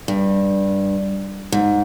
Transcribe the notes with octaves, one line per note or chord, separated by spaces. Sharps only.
G2
G#2